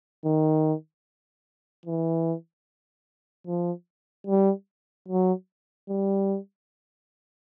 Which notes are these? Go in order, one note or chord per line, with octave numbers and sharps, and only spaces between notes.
D#3
E3
F3
G3
F#3
G3